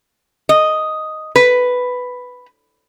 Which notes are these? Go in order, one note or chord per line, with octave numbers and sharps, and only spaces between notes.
D#5
B4